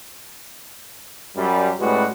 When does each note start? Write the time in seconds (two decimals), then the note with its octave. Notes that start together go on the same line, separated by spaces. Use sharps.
1.36 F#2 G3
1.80 A2 G3 G#3 C#4 F#4 B4